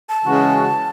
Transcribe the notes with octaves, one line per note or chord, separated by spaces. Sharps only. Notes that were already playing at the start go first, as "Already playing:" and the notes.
A5
C#3 E3 G#3 C#4 F#4